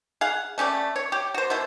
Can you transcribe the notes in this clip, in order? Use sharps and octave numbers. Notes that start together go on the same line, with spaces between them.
G#4 F5 F#5
A3 C#4 G4 D5
C#5
G4
F#4 C5
B2 E4 C5